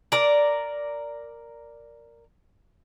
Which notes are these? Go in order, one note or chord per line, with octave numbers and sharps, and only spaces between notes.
A#4 D5